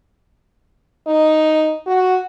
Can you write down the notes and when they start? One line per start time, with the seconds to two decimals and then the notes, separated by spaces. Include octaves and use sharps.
1.07 D#4
1.87 F#4